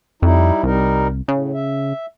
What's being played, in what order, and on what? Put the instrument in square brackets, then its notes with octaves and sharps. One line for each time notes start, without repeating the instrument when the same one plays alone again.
[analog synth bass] F2 [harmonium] G3 D#4 E4
[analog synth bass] C2 [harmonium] G3 D#4 A#4
[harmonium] A2 [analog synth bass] C#3
[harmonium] E5